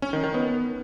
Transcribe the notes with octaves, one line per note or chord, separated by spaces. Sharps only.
C#4
D#3
D#3
B3